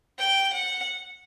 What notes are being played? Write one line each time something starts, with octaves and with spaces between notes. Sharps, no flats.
G5
F#5